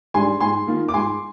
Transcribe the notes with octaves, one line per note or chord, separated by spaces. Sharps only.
G#2 G3 D4 G#5 C6
G#2 G#5 C6
D#3 A#3 F4
D6
G#2 G#5 C6